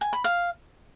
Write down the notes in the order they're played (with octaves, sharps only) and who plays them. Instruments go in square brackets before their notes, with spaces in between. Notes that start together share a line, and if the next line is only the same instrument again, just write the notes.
[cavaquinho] G#5
B5
F5